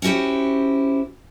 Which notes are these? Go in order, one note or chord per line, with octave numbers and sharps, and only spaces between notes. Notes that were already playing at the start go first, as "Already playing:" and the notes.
C#4 E4 F#4 G4 C5